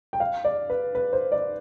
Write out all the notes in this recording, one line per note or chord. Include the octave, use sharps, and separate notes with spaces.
G5
F5
D5
B4
B4
C5
D5